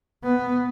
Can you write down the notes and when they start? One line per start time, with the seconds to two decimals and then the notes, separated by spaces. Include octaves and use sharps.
0.23 B3